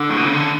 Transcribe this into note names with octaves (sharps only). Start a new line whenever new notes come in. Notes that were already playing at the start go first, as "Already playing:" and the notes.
Already playing: D3
A2
B2
C#3
D3